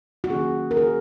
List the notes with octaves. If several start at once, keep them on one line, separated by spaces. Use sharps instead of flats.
F#4
D#3 A#3 C#4 G#4
A#4
G#4